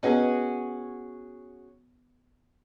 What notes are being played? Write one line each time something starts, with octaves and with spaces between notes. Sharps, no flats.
B3 C#4 F#4 G#4 B4 D#5